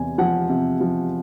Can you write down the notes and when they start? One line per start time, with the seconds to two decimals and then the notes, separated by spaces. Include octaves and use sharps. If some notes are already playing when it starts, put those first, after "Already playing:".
Already playing: E2 C3 G#5
0.18 F3 F#5
0.49 C3
0.80 F3